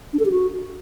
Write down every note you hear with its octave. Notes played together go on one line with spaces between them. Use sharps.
D4
A4
G4
F#4